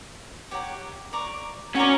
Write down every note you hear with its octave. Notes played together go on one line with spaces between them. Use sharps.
G4 C#5 F#5 A#5
D5 A#5 C#6
C#4 F#4 A#4 D5 A#5